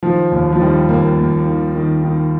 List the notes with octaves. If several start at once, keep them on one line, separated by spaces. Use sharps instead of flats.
D#3 F3
D#2
F3
D#3 G3
D#2 A#3
D#2
D#3
D#3
D#3